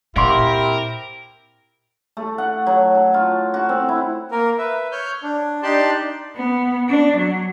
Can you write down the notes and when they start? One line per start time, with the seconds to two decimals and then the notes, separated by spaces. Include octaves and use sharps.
0.16 A#2 C4 E4 G4 A#4 F5 F#5 C6
2.17 A3
2.38 F#5
2.67 F#3
2.95 A5
3.14 F4
3.54 F#4
3.69 C4
3.89 E4
4.32 A#3 A#4
4.58 B4 E5
4.92 C#5 F6 G6
5.23 D4
5.63 D4 D#4 G4 D5 A5 C6
6.35 B3
6.88 D4
7.17 F#3